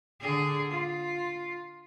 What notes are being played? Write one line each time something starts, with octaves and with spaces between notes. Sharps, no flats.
D3 G#4
F4